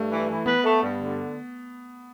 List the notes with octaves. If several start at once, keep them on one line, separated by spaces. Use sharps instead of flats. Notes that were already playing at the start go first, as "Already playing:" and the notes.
Already playing: G2 A3
E3
E3
B3 B4
A3
G2
D3